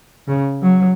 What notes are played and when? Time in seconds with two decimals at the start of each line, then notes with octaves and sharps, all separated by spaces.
0.28 C#3
0.62 F#3